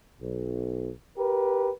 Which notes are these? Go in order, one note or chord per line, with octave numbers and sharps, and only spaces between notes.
B1
G4 A#4 B4